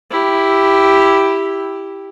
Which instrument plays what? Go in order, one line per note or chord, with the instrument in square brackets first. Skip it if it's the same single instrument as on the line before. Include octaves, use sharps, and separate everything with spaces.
[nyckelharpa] E4 G4